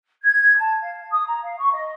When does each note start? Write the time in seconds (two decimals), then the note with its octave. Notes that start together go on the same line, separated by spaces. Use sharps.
0.22 G#6
0.57 A5
0.82 F5
1.11 D#6
1.26 A#5
1.42 F5
1.59 C#6
1.72 D#5